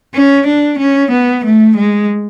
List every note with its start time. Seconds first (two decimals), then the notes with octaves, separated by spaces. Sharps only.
0.14 C#4
0.47 D4
0.79 C#4
1.11 B3
1.45 A3
1.77 G#3